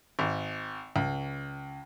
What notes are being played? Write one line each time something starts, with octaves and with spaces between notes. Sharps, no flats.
G#1
C#2